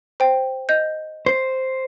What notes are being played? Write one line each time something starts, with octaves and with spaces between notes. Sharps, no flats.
C5 G5
D#5 G6
C5